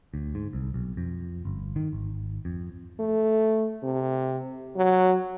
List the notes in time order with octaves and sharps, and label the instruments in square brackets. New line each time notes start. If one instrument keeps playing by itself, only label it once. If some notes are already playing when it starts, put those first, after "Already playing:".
[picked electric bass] D2
G#2
C2
B1
F2
G1
D#3
G#1
F2
[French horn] A3
C3
F#3